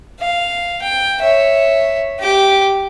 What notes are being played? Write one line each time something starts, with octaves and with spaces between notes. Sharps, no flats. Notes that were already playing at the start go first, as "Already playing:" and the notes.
F5
G5
C#5 E5
G4 D6